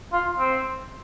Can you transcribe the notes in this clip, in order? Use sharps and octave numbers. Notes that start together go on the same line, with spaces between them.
F4
C4